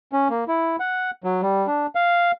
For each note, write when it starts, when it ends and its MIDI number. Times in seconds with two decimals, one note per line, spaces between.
0.12 0.28 61
0.30 0.44 58
0.48 0.76 64
0.80 1.11 78
1.24 1.41 54
1.42 1.67 55
1.67 1.87 62
1.95 2.32 77